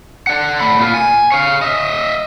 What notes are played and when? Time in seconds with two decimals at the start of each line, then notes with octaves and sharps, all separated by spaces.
0.27 D5 F#5
0.60 A3 B5
0.79 A#2 F4
0.94 G#5
1.32 C#5 F5
1.62 D#5 E5